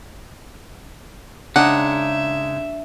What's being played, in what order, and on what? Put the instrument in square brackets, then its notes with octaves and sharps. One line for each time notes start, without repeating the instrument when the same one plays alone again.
[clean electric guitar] C#3 G#3 D#4 [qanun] D4 [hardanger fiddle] E5 [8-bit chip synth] F#5